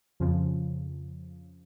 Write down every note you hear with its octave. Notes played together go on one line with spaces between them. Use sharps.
F2 C#3 F3